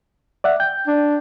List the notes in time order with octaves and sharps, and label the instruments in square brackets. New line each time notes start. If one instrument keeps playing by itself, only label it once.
[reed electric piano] D5 E5 F#5
G5 G6
[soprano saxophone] D4